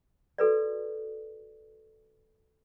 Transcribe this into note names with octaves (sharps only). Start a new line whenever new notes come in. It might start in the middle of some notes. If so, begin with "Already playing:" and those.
F#4 A4 B4 D5